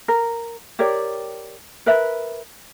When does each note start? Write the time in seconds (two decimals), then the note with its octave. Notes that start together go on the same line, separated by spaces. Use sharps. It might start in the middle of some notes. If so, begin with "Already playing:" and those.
0.08 A#4
0.79 G4 A#4 C#5 D5
1.86 A#4 B4 E5